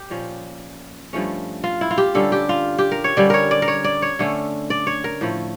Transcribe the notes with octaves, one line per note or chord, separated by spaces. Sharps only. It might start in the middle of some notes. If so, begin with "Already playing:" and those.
Already playing: G4
A#2 F3 C#4
G2 F3 A3 C#4
F4
E4
F4
G4
D3 G3 C#4 A4
G4
F4
G4
A#4
C#5
D3 G3 C#4 D5
A#4 C#5
D5
A#4
C#5
D5
C#5
D3 A3 C#4
D5
C#5
A#4
A2 F3 A3